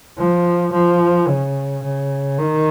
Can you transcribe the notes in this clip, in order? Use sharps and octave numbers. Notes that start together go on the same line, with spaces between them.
F3
F3
C#3
C#3
D#3